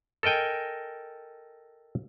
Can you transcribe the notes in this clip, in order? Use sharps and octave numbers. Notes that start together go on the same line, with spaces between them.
A4 A#4 D#5 G5 G#5